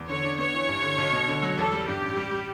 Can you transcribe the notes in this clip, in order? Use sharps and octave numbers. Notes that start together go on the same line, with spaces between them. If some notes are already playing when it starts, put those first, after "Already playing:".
Already playing: E2
D3 C#5
D4
B3 C#5
E3
G2
D3
B1
B2
D3
F#3
E2 A4
G3
G2 G4
A1
G3
G3